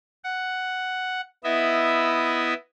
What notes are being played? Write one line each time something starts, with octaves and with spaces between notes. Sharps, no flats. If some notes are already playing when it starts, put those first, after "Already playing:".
F#5
B3 E4 D#5 E5